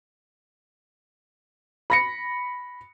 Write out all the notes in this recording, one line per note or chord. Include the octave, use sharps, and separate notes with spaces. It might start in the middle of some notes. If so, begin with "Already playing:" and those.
B5 A#6 C#7